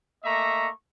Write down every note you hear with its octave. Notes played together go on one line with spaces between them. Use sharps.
A3 A#3 D#5 E5 A#5 C#6